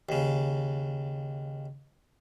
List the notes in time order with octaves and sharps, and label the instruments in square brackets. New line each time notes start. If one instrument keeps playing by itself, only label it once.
[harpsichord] D#2 C#3